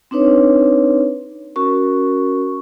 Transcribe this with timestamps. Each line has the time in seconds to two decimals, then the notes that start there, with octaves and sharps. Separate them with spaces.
0.11 C4 D4 D#4 B4 C#5
1.56 C#4 F#4 A#4 C#6